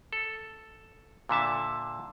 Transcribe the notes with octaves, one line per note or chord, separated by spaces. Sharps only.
A4
A#2 D3 E5 A5